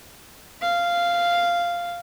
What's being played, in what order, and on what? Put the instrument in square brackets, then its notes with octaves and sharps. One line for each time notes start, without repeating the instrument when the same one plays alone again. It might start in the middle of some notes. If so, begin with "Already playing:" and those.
[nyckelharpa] F5